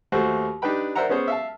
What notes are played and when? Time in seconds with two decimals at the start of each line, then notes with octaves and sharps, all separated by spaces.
0.12 D#2 A3 F#4 C5
0.62 D4 D#4 G4 B4 G5 B5
0.96 A#4 C5 D5 E5 F#5 A#5
1.09 B3 C#4 G#4 C5 C#5
1.28 E5 F5 A5